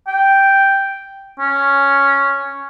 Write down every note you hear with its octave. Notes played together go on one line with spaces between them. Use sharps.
G5
C#4